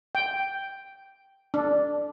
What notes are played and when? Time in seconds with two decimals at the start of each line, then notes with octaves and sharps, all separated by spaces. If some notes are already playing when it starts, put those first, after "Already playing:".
0.15 G5
1.54 D4